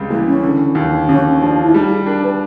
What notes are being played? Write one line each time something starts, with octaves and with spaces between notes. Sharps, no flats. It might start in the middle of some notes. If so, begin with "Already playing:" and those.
Already playing: C#2 C3 G3
E3 A#3
C#4
D3
D#2
D#2 C#4
F3 D4
E4
G3 D#4
G#4
D4 A#4
B4